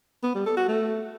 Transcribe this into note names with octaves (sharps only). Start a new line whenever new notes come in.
B3
G3
A4
F#4
A3